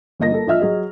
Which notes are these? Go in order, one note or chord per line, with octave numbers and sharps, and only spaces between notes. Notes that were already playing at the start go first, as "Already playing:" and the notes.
G1 A#3 D#5 A#6
A#3 A4
A#1 D#5 E5 F6
F#3 G#4 D#5